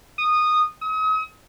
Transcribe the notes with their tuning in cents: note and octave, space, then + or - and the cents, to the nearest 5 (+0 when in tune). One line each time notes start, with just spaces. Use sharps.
D#6 -15
D#6 +40